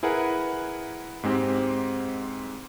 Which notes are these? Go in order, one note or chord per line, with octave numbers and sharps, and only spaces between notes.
E4 G#4 A#4 B4 F#5
G#2 G#3 C4 G4 G5